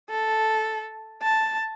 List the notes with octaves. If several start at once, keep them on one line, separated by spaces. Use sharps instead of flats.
A4
A5